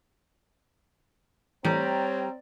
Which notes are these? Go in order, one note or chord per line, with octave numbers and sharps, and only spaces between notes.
A2 E3 G3 A3 C4 C#5 A#5